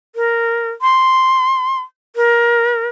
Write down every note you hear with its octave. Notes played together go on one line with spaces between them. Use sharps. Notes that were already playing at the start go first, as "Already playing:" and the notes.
A#4
C6
A#4